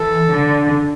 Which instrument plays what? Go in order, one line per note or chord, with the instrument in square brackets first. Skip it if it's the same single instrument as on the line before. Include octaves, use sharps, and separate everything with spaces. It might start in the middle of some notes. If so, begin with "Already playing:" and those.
Already playing: [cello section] E3 [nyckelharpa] A4
[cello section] D3